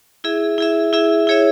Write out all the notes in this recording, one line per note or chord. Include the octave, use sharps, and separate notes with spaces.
E4 G#4 E5
E4 G#4 E5
E4 G#4 E5
E4 G#4 C#5 E5